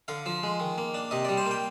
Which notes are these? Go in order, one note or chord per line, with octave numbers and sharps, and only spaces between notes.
D3 F5
F3
G#3
D#3
A#3
D4
C3 D#5
G3 D5
C5
A#3
G5